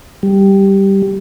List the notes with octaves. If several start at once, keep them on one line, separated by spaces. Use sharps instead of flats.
G3